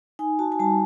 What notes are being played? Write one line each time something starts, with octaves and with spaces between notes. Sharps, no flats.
D#4 G#5
F#4 A5
G#5
G3 A5